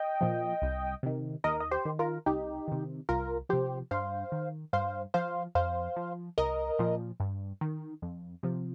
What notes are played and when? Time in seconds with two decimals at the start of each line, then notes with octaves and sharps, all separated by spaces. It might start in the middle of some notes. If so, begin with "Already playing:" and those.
Already playing: D#5 G5
0.21 A#2 F3
0.62 C2
1.03 C3 D#3
1.44 D#2 A#4 D#5
1.60 D#5
1.71 G4 C5
1.85 D#3
1.99 F4 A#4
2.26 C2 D#4 G4
2.68 C3 D#3
3.09 C2 F4 A#4
3.49 C3 F3 G4 C5
3.91 G2 C5 F5
4.32 D#3
4.73 G2 C5 F5
5.14 F3 C5 F5
5.55 F2 C5 F5
5.96 F3
6.38 C2 A#4 D#5
6.79 A#2 F3
7.20 G2
7.61 D#3
8.02 F2
8.43 C3 F3